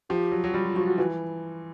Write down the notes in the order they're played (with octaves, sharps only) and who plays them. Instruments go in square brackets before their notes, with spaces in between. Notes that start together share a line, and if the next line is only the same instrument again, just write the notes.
[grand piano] F3 [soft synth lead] G4
[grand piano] F#3
F#3
[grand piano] G3 [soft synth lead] F#4
[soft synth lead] F4
[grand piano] F3 [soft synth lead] F#4
[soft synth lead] F#4
[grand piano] E3 [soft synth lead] F#4